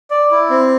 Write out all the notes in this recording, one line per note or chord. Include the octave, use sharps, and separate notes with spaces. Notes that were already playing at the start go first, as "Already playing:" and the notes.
D5
E4
C4